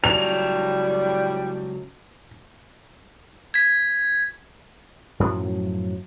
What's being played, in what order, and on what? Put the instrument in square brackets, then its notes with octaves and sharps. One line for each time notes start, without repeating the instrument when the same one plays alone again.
[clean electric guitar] C#2 F#3 A4 [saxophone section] A2 G3 [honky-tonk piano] F7
[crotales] G#6 B6
[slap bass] F#2 A2 F3 F#3